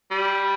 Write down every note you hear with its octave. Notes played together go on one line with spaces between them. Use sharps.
G3